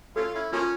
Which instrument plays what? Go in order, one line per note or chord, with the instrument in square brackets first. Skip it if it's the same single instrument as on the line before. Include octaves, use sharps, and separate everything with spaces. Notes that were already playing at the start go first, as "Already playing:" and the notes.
[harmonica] A3 C#4 F4 [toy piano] A4
[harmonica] C#4 E4
[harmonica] F3 A#3 C#4 [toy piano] F4